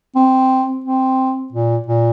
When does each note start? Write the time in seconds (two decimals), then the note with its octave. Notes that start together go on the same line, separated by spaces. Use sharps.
0.16 C4
0.84 C4
1.52 A#2
1.87 A#2